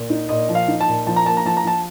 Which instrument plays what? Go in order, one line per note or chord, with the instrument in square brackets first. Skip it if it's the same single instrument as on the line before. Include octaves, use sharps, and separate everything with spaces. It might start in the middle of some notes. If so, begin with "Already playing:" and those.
Already playing: [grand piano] A#2
D#4
A#2 D#5
F3
F5
D#4
A5
A#2
F3 A5
A#5
A#3 A5
A#5
F3 A5
A#5
F3 A5